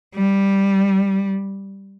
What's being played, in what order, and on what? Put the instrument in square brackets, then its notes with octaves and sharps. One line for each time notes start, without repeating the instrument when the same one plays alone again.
[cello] G3